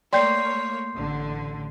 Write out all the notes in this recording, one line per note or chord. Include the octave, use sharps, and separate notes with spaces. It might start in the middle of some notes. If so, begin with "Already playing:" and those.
A3 A#3 C#5 D5 G5 C6 G6 C7
A1 D3